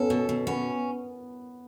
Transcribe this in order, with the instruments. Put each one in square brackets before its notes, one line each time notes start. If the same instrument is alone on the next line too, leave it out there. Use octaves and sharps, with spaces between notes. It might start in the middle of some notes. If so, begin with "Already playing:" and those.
Already playing: [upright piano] B3 C#4 [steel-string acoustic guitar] A4
[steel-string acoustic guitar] B2
B2
[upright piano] B3 [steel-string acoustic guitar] C#4